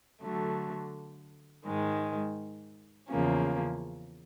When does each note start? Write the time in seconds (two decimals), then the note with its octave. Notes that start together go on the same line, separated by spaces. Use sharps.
0.22 D3 F#3 A3
1.66 G#2 D#3 G#3
3.09 E2 C#3 F3 A#3 C#4